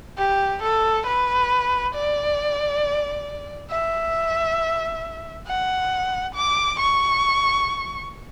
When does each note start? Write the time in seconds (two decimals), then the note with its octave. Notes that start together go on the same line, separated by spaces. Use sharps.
0.18 G4
0.63 A4
1.07 B4
1.95 D5
3.71 E5
5.47 F#5
6.35 D6
6.80 C#6